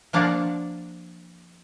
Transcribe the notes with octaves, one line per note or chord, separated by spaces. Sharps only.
F3 A#3 D4 F5 F#5 A#5